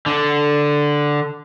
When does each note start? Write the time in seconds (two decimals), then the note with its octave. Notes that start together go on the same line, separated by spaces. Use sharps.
0.06 D3